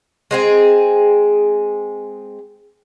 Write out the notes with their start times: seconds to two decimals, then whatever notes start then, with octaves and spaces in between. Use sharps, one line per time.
0.31 G#3 C4 G#4